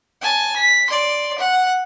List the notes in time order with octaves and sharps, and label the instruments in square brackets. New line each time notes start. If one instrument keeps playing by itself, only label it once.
[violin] G#5 A5
B6
D5 C6
F#5